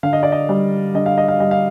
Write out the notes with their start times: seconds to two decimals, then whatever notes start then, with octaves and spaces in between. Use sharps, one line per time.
0.03 D3 F5
0.13 D#5
0.23 D5
0.32 D#5
0.49 G3
0.94 D3 D#5
1.06 F5
1.18 D#5
1.28 F5
1.40 G3 D#5
1.51 F5